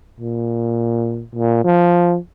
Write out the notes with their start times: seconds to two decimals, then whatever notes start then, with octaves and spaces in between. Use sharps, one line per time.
0.20 A#2
1.35 A#2
1.64 F3